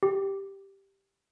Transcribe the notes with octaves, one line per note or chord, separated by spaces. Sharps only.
G4